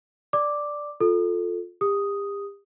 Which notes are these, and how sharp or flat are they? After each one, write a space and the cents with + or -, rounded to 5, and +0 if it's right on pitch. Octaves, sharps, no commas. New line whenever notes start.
D5 +0 D6 +0
F4 +20 A4 +0
G4 +40 D#6 +0